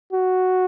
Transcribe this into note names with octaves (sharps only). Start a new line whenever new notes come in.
F#4